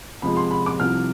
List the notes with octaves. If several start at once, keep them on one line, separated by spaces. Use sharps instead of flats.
C3 F3 G#3 B5
C6
B5
D6
C2 C3 F3 F6